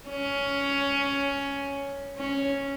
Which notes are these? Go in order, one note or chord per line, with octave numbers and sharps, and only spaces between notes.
C#4
C#4